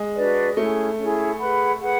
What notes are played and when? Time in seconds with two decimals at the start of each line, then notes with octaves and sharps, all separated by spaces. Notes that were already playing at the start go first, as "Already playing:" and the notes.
Already playing: G#3
0.16 D4 F#4 B4 D5
0.57 A3 C#4 E4 G#4
0.98 C#4 E4 G#4
1.38 G#4 B4 F#5 B5
1.80 G#4 B4 F#5 B5